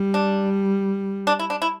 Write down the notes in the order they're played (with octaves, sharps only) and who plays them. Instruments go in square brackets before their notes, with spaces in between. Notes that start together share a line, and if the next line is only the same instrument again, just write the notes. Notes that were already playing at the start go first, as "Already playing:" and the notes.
Already playing: [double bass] G3
[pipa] D4
D4
E4
D4
E4